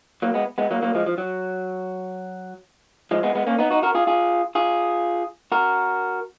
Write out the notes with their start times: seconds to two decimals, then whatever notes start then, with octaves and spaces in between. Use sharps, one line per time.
0.22 F#3 A#3
0.34 G#3 B3
0.58 G#3 B3
0.71 F#3 A#3
0.82 F#3 A#3
0.95 F3 G#3
1.06 F3
1.18 F#3
3.11 F3 G#3
3.23 G#3 B3
3.35 G#3 B3
3.47 A#3 C#4
3.58 B3 D#4
3.70 D#4 F#4
3.83 F#4 A#4
3.95 F4 G#4
4.07 F4 G#4
4.55 F4 G#4
5.52 F#4 A#4